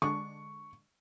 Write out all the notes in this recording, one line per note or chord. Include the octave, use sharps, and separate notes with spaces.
D3 G#3 D4 C#6